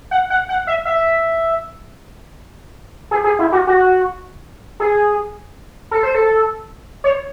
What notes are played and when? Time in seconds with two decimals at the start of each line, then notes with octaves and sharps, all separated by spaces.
0.11 F#5
0.30 F#5
0.49 F#5
0.67 E5
0.85 E5
3.11 G#4
3.24 G#4
3.39 E4
3.52 F#4
3.67 F#4
4.80 G#4
5.91 A4
6.03 C5
6.15 A4
7.04 C#5